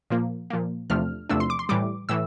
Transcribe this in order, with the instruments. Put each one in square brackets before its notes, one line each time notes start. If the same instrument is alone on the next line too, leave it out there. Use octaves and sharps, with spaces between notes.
[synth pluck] A#2 F3 A#3
A#2 F3 A#3
E2 C3 F3 A3 D4 F6
E2 C3 F3 A3 D4 E6
C6
D6
C6
A2 E3 G3 D6
A2 E3 E6